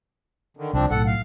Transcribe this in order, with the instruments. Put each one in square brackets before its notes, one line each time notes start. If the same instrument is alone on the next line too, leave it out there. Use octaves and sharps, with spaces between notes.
[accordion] D3 D#3
[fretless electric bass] C2 [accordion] F3 C4 D4
[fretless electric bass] B1 A2 [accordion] A4 F#5
[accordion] F5